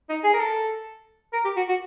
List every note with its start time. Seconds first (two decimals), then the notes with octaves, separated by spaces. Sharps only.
0.09 D#4
0.24 G#4
0.34 A#4
0.40 A4
1.33 A#4
1.45 G4
1.57 F#4
1.69 F#4